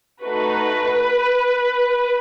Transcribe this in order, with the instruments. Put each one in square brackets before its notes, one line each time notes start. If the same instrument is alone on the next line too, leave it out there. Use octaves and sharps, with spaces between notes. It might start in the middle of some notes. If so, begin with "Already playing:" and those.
[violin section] A3 D#4 F#4 B4